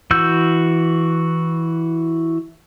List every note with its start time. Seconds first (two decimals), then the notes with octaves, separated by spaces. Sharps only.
0.11 E3 F#4 E6 G6